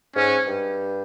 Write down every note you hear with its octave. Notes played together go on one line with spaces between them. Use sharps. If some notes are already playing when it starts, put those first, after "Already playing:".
G#2 C#4
G2